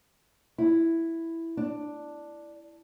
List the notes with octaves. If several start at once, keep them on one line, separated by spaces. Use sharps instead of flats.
E4
D4